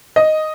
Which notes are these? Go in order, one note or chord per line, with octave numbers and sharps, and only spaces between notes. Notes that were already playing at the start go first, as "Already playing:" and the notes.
D#5